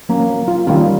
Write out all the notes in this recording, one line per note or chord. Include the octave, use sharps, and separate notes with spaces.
F#3 A#3 C#4
F4
D#3 G3 A#3 C#4 F4